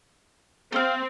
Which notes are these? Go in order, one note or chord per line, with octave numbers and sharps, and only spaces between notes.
C4 C5 F5